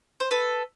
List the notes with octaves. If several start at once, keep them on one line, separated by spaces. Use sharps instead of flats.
C5
A4 B4